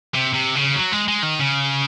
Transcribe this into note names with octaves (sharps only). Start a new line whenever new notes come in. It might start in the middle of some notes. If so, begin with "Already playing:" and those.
C3
C3
C#3
F#3
G#3
G#3
D#3
C#3